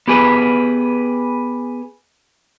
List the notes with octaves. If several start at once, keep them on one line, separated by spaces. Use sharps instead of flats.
B3 G4 G#4 B4